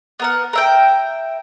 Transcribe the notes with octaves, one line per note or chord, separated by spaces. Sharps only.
B3 A#4 F#5
A#4 E5 G5